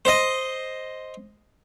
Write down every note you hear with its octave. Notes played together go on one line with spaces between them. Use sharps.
C5 D#5